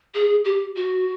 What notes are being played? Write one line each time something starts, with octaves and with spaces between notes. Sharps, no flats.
G#4
G4
F#4